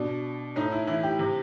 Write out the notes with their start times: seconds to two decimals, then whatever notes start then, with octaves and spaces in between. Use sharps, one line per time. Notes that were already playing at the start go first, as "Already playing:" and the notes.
Already playing: B2 D4
0.56 A2 D#4
0.72 E4
0.87 E3 E4
1.03 G4
1.19 C3